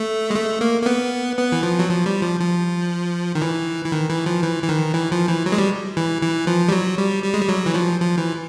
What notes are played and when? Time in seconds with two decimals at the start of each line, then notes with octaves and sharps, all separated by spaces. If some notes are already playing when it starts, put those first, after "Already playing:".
Already playing: A3
0.30 G#3
0.36 A3
0.61 A#3
0.82 A#3
0.86 B3
1.37 B3
1.52 E3
1.63 F3
1.79 F#3
1.89 F3
2.06 G3
2.22 F3
2.40 F3
3.35 D#3
3.42 E3
3.85 E3
3.92 D#3
4.10 E3
4.26 F3
4.43 E3
4.63 E3
4.69 D#3
4.94 E3
5.12 F3
5.28 E3
5.46 F#3
5.52 G#3
5.58 G3
5.97 E3
6.22 E3
6.47 F3
6.69 G3
6.72 F#3
6.98 G3
7.24 G3
7.34 G#3
7.42 G3
7.49 F#3
7.66 E3
7.74 F3
8.00 F3
8.18 E3